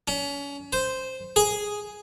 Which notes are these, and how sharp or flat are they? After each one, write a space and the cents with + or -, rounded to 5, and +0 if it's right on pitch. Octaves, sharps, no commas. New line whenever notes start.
C#4 +30
C5 -5
G#4 +0